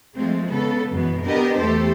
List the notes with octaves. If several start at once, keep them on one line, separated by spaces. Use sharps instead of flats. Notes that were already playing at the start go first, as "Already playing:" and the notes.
F3 G#3 A3 C4
C#3 B3 A4
F#2 B2 E3 B3
B3 D4 G4 A#4 D#5
E2 A3 G4 A4 C5